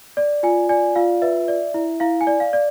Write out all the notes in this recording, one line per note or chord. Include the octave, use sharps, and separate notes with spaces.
D5
F4 G#5
D5 G#5
F4 F5
B4 E5
D5
E4
E4 F5
G#5
D5
F5
D5